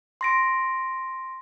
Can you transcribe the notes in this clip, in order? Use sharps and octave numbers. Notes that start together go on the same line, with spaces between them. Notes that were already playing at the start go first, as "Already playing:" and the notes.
C6 A#6 D7